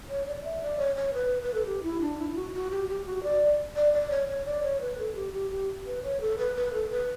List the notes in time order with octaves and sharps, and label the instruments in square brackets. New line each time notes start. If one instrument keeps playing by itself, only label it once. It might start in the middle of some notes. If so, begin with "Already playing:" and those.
[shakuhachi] C#5
D5
E5
D5
C#5
C#5
B4
B4
A4
G4
E4
D4
E4
F#4
E4
F#4
G4
G4
F#4
D5
D5
D5
C#5
C#5
D5
C#5
B4
A4
G4
G4
G4
B4
C#5
A4
B4
B4
A4
B4